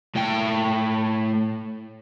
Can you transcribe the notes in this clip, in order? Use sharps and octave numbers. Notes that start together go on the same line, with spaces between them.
A2 G5